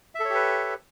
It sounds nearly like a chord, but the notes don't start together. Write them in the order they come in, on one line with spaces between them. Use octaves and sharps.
E5 A4 C#5 G4 B4